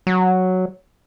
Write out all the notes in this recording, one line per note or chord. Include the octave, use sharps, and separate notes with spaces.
F#3